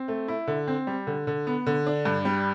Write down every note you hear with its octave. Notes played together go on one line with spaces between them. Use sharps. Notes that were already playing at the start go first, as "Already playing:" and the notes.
Already playing: C4
A3
E4
D3
C4
G3
D3
D3
B3
D3
D4
G2
G3